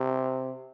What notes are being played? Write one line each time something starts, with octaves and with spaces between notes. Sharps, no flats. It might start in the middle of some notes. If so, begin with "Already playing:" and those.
Already playing: C3